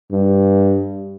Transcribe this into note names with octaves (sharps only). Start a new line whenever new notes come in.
G2